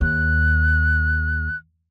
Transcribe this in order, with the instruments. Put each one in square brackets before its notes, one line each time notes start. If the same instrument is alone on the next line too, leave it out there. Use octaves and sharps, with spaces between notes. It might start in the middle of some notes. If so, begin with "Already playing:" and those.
[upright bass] D#2 [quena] F#6